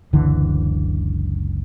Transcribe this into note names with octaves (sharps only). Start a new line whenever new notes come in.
F#1 C#2 D3 E3